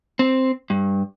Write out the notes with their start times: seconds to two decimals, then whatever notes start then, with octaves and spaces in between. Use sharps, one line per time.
0.19 C4
0.70 G2